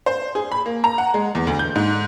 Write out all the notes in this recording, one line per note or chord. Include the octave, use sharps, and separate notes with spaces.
C5
G#4
B5
A#3
A#5
F#5
G#3
E2
D2
G6
G#2